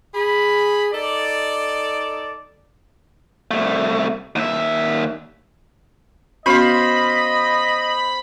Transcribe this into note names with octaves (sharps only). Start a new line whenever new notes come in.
G#4 B5
D#4 A4 D5
C2 A3
D#2 E5
B3 C#4 F#4 C5 D#5 F5 B5 C6